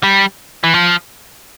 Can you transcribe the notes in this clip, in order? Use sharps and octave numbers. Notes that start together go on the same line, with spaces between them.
G3
E3
F3